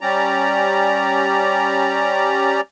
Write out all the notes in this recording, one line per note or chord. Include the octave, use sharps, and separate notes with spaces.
G3 C#4 G4 D5 A#5